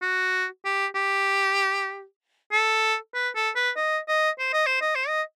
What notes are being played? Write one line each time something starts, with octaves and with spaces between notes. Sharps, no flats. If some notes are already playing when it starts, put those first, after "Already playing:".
F#4
G4
G4
A4
B4
A4
B4
D#5
D#5
C5
D#5
C5
D#5
C5
D#5